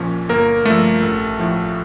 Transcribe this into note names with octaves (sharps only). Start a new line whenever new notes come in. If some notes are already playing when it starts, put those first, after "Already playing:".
Already playing: A#1 A#2 F3 C#4
G1 A#3 A#4
G2 F3 A3 A4
A1
A2 F3